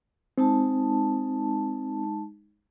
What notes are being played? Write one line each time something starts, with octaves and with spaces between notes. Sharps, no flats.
G#3 C4 D#4 A5